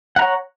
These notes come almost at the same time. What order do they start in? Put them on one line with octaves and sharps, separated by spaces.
F#5 A#5 C#5